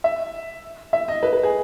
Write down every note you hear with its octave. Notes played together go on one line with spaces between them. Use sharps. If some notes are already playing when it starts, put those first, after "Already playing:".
E5
E5
D#5
B4
B4
G#4